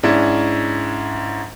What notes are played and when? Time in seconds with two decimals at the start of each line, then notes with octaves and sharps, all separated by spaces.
0.03 G#2 C#4 D4 E4